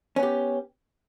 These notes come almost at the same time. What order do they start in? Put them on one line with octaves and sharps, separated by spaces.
C#4 B3 G4